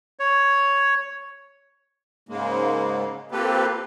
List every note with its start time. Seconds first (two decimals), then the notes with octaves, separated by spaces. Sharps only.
0.19 C#5
2.29 G#2 C#3 G#3 A#3
3.32 A#3 C4 F4 G4 A4 B4